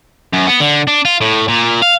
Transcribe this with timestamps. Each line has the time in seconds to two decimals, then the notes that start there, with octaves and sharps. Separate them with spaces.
0.33 F#2
0.47 B3
0.60 D3
0.87 D4
1.05 F4
1.21 A2
1.48 A#2
1.83 F5